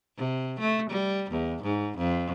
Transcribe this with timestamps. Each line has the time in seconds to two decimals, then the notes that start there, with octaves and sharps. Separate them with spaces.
0.17 C3
0.60 A3
0.90 G3
1.30 E2
1.63 G#2
1.98 F2